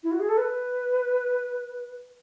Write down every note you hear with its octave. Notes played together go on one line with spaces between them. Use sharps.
E4
F#4
G#4
A4
B4